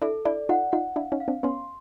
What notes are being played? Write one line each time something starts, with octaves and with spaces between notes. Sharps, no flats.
D4 E4 A4
D4 E4 D5
D#4 F4 F#5
D#4 F4 F#5
D4 E4 F5
C#4 D#4
F5
C4 D4
B3 C#4 C6